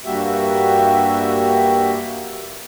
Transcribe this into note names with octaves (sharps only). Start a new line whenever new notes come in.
G2 G3 A#3 F#4 G4 E5